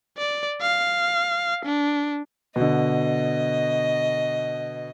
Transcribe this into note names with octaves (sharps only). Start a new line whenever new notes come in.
D5
F5
D4
B2 D3 D#5